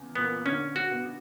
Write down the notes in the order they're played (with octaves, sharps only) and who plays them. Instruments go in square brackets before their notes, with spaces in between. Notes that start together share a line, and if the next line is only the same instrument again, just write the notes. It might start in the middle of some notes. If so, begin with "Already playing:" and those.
Already playing: [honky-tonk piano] E2 C#3 E3
[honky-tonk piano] A#2 A#3 [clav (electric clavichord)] B3
[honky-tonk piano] D3 D4 [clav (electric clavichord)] C#4
[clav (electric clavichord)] F#4
[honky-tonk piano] B2 B3